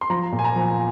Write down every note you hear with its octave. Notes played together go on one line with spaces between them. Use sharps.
C6
F3 A#5
A#2
G#5
A#5
F3